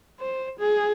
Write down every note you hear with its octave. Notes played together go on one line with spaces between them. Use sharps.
C5
G#4